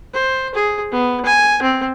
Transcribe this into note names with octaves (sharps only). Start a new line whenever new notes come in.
C5
G#4
B3
G#5
C4